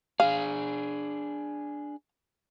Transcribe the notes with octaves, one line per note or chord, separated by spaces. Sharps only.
D4 G#4 F5